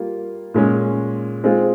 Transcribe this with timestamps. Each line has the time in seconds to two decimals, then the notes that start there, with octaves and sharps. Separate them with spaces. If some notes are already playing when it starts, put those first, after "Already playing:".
Already playing: G3 A#3 F4
0.54 A#2 G#3 C#4
1.44 G#3 C4 F4 G#4